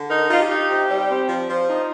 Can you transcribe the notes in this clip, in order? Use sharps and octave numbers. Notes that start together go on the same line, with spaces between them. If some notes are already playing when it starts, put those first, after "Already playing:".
Already playing: D3
D#4 A#4
D#4 F4
G4
D#4
C3
G3
C4
F3
F3
D#4